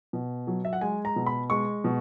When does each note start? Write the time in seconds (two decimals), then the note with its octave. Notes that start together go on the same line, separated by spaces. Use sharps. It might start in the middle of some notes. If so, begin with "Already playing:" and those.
0.13 B2
0.47 F#3
0.65 E5
0.73 F#5
0.81 G#3 G#5
1.05 A#5
1.16 B2
1.26 B5
1.50 G#3 C#6
1.84 B2